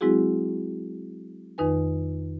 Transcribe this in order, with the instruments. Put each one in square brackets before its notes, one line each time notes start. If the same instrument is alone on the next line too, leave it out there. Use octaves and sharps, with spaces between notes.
[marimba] F#3 G#3 C4 E4 F#4 G#4
F2 D#3 D#4 B4 G#5